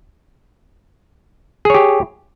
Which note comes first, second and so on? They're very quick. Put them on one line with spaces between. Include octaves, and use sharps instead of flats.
G#4 C#5 G4